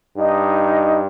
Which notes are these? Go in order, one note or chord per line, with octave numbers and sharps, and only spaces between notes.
G2 D#4